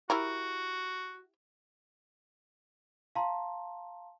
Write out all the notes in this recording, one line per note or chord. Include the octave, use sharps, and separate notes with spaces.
E4 F#4 G4 A#4
F5 A5 A#5 C6